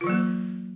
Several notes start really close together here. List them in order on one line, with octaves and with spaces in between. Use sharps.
F4 E3 F#3 A#3